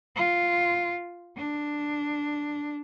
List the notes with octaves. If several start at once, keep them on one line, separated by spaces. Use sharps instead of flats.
F4
D4